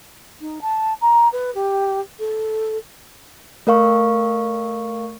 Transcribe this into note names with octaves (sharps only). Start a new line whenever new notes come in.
D#4
A5
A#5
B4
G4
A4
A3 A#4 F5 C#6